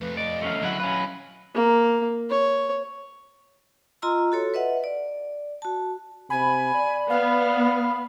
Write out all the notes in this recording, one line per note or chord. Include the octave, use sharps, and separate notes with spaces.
F2 A3 B4
D5 D#5
A3 C#4 F5
D3 F#3 E4 F#5
C#4 B4 F5
A#3
C#5
F4 D#5 A#5 C6 E6
F#4 A4 C#5
B4 D#5 E5 F#5
D5
F#4 A5
C3 G#5 B5
D5
B3 F5